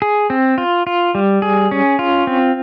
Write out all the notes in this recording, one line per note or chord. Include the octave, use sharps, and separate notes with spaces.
G#4
C4
F4
F4
G3
G#4
C#4
F4
C4